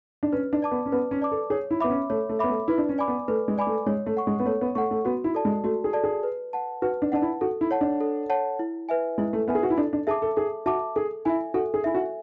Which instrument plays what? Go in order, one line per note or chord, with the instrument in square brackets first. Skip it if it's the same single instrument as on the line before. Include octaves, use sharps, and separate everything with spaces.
[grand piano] D4
[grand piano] C#4 [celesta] B4
[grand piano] D4
[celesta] D5 A5 D6
[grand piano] B3
C#4
[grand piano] B3 [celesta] B4
[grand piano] C#4
[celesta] D5 A5 D6
[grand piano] A4
[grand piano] G#4 [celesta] C#5
[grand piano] E4
[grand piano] B3 [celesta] E5 B5 D6
[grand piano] C#4
[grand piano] A3 [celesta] C#5
[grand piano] A3
[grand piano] B3 [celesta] E5 B5 D6
[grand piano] A3
[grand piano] E4 [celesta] B4
[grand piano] D4
C#4
[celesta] D5 G#5 B5 D6
[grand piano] B3
[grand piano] A3 [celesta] B4
[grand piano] G#3
[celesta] D5 G#5 B5 D6
[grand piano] A3
[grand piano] G#3 [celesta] C#5
[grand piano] A3
[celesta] F#5 C#6
[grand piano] G#3
B3
[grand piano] A3 [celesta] C#5
[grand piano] B3
[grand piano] A3 [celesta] C#6
[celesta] F#5
[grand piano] A3
[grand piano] B3 [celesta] F#4
[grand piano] E4
[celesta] A4 D5 A5
[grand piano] G#3
[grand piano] A3 [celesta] F#4
[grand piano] G#4
[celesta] A4 D5 A5
[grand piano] G#4
[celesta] B4
F#5 A5
[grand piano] F#4 [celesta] B4
[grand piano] D4
[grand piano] D4 [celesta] F#5 A5
[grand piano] E4
[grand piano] F#4 [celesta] A4
[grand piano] E4
[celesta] C#5 F#5 A5
[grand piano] D4
[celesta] A4
C#5 F#5 A5
E4
B4 E5 G#5
[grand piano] G#3 [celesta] E4
[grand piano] A3
[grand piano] B3 [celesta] B4 E5 G#5
[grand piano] G#4
F#4
E4
[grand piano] D4 [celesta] A4
[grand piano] D4
[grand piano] G#4 [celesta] E5 A5 D6
[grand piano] A4
[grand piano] G#4 [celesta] A4
[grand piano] F#4 [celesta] E5 A5 D6
[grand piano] G#4 [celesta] A4
[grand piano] E4 [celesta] E5 G#5
[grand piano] F#4 [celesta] A4
[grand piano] G#4
[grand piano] E4 [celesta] E5 G#5
[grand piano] F#4